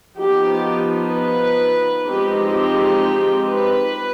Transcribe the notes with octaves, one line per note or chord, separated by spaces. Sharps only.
F3 B3 D#4 G4
B4
F3 G#3 C4 D#4 G4
G4
B4